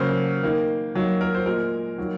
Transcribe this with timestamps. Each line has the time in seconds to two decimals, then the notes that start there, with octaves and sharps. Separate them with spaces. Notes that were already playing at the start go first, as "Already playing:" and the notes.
Already playing: C#3 F#3 A#3 C5
0.43 D#3 A#3
0.95 D#3 F#3 A#3
1.21 A#4
1.35 C5
1.46 A#2 G#3 A#4
1.98 D#3 F#3 A#3